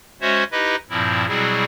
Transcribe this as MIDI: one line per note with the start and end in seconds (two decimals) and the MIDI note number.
0.21 0.44 56
0.21 0.44 61
0.21 0.44 66
0.21 0.44 72
0.21 0.44 73
0.21 0.44 76
0.52 0.76 63
0.52 0.76 64
0.52 0.76 67
0.52 0.76 71
0.52 0.76 75
0.90 1.27 43
0.90 1.27 46
0.90 1.27 53
0.90 1.27 60
0.90 1.27 64
1.27 1.64 47
1.27 1.64 54
1.27 1.64 55
1.27 1.64 60
1.27 1.64 64
1.27 1.64 68